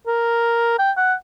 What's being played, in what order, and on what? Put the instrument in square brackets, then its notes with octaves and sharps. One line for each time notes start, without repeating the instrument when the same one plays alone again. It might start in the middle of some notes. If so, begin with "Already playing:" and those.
[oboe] A#4
G5
F#5